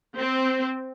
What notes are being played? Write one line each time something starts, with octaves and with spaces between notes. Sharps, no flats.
C4